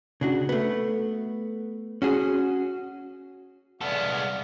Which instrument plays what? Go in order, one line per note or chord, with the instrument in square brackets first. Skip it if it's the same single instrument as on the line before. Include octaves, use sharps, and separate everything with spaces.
[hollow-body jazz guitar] C#3 D4 F#4
A3 B3
C#4 F#4 G#4
[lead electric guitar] C2 B3 [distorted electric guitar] G#3 A4 [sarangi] D5 [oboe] F5